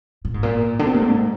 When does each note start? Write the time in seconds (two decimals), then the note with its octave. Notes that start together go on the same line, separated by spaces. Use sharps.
0.25 A#2
0.34 G#2
0.43 A#2
0.79 D3
0.86 C3
0.94 A#2
1.01 G#2